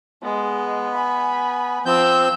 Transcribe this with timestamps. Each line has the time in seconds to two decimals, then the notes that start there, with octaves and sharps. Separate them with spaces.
0.23 G#3 B3
0.94 G#5 B5
1.86 F3 C4 E6 G6